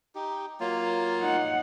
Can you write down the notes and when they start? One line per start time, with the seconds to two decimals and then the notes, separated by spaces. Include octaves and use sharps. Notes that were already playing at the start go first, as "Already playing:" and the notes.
0.15 D#4 G4
0.60 F#3 A#3 F4
1.20 D#4 F#5